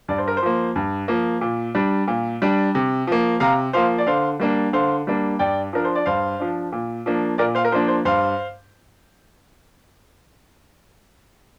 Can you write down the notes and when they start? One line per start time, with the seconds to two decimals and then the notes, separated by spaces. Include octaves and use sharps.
0.08 G2 D5
0.18 C5
0.28 A#4
0.37 C5
0.42 F3 A#3
0.76 G2
1.08 F3 A#3
1.41 A#2
1.75 G3 D4
2.08 A#2
2.42 G3 D4
2.75 C3
3.07 F3 A#3
3.40 C3 F5 A#5
3.73 F3 A#3 C5 F5
3.98 D5
4.07 D3 C5 F5
4.40 G3 A#3 D4
4.73 D3 C5 F5
5.07 G3 A#3 D4
5.39 G2 D5 G5
5.73 F3 D4 A#4
5.85 C5
5.95 D5
6.06 G2 C5 F5
6.40 F3 D4
6.72 A#2
7.06 F3 A#3 D4
7.38 A#2 A#4 D5
7.55 C5 F5
7.65 A#4
7.72 F3 A#3 D4 C5
7.88 C5
8.05 G2 C5 F5